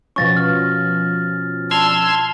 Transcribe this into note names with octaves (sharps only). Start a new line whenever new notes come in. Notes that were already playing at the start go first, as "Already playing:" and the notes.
B2 F3 C#4 C#6 A6 A#6
F6
A5 C6 E6 G#6 F7 G7